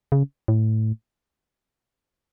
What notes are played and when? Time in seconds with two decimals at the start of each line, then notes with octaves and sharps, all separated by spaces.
0.12 C#3
0.48 A2